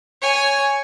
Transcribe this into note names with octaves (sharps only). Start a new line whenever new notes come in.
C#5 G#5